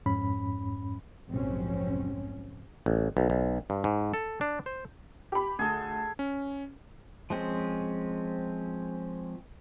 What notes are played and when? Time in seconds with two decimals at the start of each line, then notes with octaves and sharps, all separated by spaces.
0.06 F2 G#2 C#4 B5
1.30 F1 A#1 G#2 F#3 C4 C#4
2.86 A1
3.17 B1
3.30 B1
3.70 G2
3.84 G#2
4.14 A4
4.41 D4
4.66 C5
5.32 G4 B5
5.59 D2 G#4 A4
6.19 C#4
7.30 F3 G#3 C4 C#4